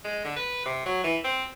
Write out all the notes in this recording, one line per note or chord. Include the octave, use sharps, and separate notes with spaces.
G#3
D3
B4
C3
F#3
E3
C4